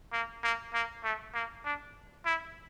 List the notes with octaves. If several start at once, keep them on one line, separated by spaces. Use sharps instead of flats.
A#3
A#3
A#3
A3
A#3
D4
E4